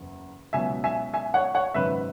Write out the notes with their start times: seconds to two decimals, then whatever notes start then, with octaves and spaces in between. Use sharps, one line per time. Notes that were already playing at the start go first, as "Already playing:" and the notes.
Already playing: F#1 E2
0.53 C#2 B2 F#3 E5 G#5
0.84 E5 G#5
1.14 E5 G#5
1.34 C#5 F#5
1.55 C#5 F#5
1.74 G#1 F#2 C#3 B4 E5